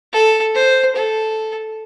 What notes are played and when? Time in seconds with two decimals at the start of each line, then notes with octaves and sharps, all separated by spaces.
0.13 A4
0.54 C5
0.95 A4